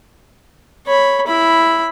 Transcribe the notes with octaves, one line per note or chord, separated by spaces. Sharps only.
C#5 B5
E4 B5